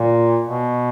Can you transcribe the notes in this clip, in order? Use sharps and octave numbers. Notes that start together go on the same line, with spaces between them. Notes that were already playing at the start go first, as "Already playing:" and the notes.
Already playing: A#2
B2